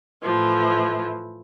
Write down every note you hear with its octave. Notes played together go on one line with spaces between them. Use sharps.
A2 E3 F3